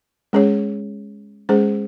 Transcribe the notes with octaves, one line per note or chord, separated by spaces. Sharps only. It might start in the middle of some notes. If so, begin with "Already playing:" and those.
G#3 C#4 G#4 C#5
G#3 C#4 G#4 C5